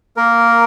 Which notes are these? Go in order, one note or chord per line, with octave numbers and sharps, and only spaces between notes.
A#3 A#4